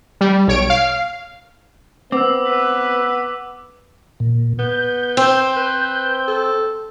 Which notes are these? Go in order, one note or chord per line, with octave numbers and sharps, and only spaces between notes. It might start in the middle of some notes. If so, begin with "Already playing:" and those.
G3
B1 C#5 D7
F5
B3 C4 D6 E6
B4
A#2
B3 G6
C4
B4
A4